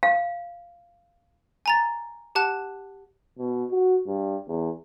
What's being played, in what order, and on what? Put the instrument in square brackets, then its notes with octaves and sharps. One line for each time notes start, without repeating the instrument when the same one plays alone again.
[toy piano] F5
[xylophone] G#5 A#5 A6
G4 F#5 A5 F#6
[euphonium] B2
F#4
G2
E2